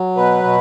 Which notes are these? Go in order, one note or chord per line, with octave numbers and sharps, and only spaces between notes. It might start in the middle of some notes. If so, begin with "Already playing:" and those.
Already playing: F#3
B2 B4
B2